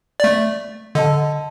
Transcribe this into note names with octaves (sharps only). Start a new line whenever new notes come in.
A3 D5
D3 D#5 A5